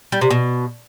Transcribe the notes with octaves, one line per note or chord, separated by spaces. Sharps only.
G3
C3
B2